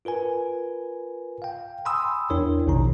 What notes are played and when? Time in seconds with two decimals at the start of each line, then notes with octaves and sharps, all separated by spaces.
0.05 F4 A#4 B4 G#5
1.42 F5 G5
1.85 G5 G#5 B5 C6 D#6 E6
2.30 E2 D4 E4 A#4 C#5
2.67 A#1 D#2 B2 D#3 D#4 A#5